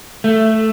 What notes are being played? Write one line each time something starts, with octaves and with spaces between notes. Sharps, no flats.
A3